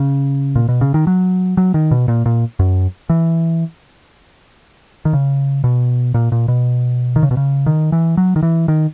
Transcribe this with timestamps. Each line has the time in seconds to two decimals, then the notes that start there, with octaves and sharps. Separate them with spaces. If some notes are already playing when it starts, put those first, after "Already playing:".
Already playing: C#3
0.56 A#2
0.69 B2
0.81 C#3
0.94 D#3
1.07 F#3
1.57 F#3
1.74 D#3
1.91 B2
2.08 A#2
2.26 A#2
2.59 F#2
3.10 E3
5.05 D#3
5.13 C#3
5.64 B2
6.14 A#2
6.32 A#2
6.48 B2
7.16 D#3
7.23 C#3
7.31 B2
7.37 C#3
7.66 D#3
7.92 E3
8.17 F#3
8.36 D#3
8.43 E3
8.68 D#3